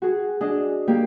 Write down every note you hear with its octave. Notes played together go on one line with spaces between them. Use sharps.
F#4 G#4
D4 G#4 D#5
A#3 G4